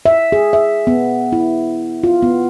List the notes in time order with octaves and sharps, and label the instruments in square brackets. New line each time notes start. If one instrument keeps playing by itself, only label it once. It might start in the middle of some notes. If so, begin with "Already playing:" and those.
[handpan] E5
G#4
E5
B3
E4
F4
B3